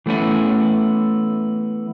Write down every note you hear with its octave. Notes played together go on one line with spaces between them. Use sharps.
E3 A3 B3 C#4 E4